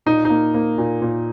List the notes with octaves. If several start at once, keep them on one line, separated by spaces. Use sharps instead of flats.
A#2 D#4
A#3 D#4
A#3
A#2
A#2